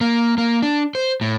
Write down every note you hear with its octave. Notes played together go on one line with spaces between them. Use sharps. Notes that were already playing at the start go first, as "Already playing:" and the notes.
A#3
A#3
D4
C5
A2